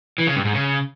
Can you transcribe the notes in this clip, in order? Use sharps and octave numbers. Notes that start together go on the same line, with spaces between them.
E3
C#3
G2
G#2
C#3